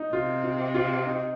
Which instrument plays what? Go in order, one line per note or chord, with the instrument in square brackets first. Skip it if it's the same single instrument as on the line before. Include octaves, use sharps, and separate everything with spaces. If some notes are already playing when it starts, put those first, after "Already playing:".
Already playing: [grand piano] D#4
[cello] C3 [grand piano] F4
[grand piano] F4
F4
D#4